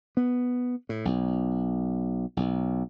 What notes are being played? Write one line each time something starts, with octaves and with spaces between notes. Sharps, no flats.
B3
A2
B1
B1